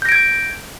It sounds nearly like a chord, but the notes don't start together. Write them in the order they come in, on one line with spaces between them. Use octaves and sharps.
G6 A#6 D7 G#6